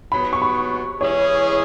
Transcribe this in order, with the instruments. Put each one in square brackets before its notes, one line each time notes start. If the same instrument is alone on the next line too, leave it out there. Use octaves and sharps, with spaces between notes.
[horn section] G#2 F#3 B3 [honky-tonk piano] B5
[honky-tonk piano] C#6
B5
[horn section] E3 G#3 C#4 E4 G#4 [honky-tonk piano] C#5